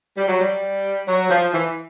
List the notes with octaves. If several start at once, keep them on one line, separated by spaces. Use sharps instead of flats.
G3
F#3
G3
F#3
F3
E3